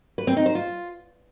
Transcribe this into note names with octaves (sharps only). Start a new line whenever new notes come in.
B4
C4
D#4
C5
F4